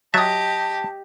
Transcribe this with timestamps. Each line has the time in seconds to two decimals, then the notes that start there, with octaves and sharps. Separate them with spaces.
0.14 F#3 G4 D#5 E5 A5 D#6 A6